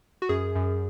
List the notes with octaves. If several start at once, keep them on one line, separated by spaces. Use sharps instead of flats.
F#4
F#2 G#4
F#2